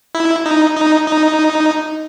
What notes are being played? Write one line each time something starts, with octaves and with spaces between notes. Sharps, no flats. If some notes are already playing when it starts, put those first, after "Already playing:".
E4
D#4
D#4
D#4